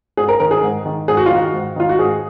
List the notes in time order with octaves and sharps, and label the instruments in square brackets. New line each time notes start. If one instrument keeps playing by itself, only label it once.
[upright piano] G#2 G#4
A#4
D#3 A#4
G#4
G#2
D#3
G#2 G#4
F#4
F4
D#3 F#4
G#2
D#3 F4
F#4
G#2 G#4